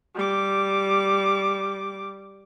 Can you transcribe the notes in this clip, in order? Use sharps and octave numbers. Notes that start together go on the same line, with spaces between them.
G3 D6